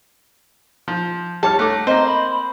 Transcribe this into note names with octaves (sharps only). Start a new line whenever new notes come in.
F3
G3 C#5 A5 F6
A3 D#4 F#5 D6
A#3 C4 C5 D#5
B5